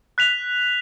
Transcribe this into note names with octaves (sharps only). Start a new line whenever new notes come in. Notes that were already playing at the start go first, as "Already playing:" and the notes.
F#6 B6 F7